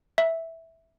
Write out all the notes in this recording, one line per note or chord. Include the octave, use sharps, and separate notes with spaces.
E5